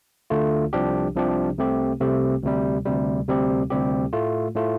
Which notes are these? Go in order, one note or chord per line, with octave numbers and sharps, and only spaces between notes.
D2 D3 A3 F4
C2 C3 F3 D4 G4
C2 C3 F3 D4 G4
C2 C3 A3 C4 G4
C2 C3 A3 C4 G4
D2 C3 G3
D2 C3 G3
D2 C3 G3 C4 G4
D2 C3 G3 C4 G4
A2 A3 F4
A2 A3 F4